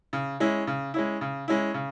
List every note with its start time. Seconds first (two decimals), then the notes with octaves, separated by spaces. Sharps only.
0.13 C#3
0.40 G#3 C#4 E4
0.67 C#3
0.94 G#3 C#4 E4
1.21 C#3
1.48 G#3 C#4 E4
1.74 C#3